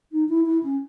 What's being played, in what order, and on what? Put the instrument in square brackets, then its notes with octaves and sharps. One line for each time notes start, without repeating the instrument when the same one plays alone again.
[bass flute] D#4
E4
E4
C#4